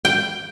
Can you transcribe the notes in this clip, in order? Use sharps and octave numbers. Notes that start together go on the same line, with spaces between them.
G5